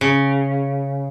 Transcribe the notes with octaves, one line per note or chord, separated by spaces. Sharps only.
C#3